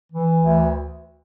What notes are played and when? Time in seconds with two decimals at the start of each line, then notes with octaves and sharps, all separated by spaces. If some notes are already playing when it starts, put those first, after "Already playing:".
0.12 E3
0.43 D2